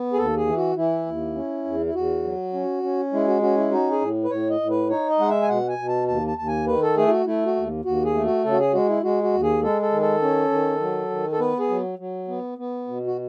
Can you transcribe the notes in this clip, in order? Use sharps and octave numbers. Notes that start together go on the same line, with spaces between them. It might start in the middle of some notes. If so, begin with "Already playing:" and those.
Already playing: B3
G#4
D#2 A4
G#4
E3
F#4
E3 E4
D#2
C#4
E2
E4
E2 F#4
F#3
C#4
C#4
G#3 E4
F#4
C#4 F#4
E4
D#4 F#4
G#4
A2
B4
A2 C#5
D#5
A2
B4
D#4 C#5
D#5
G#3 F#5
E5
G#5
B2 F#5
G#5
B2
A5
D#2 A5
A5
D#2 A5
G#5
D#3 B4
A4
A3 G#4
E4
F#4
A3 E4
F#4
D#2
D#2 F#4
G#4
A3
F#4
C#3 A4
F#4
G#4
G#3 F#4
E4
G#3 F#4
F#4
D#2
G#4
G#3 A4
A4
D#3
A4
C#4
D#3
F#3
D#3
A4
B3 B4
G#4
F#3
F#3
B3
B3
B2
F#4